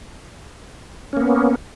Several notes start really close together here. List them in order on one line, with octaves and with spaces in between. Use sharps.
C#4 A#3 B3